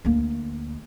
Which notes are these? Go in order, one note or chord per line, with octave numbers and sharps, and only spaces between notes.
D2 A#3